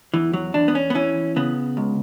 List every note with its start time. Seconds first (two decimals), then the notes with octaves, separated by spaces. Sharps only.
0.14 E2 E3
0.33 F#3
0.54 E2 D4
0.68 B3
0.75 C#4
0.90 B3
0.95 E3 C#4
1.36 C#3 B3
1.77 C#2